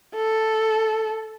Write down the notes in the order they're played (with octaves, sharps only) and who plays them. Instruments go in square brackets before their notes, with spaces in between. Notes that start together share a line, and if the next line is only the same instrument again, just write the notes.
[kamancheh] A4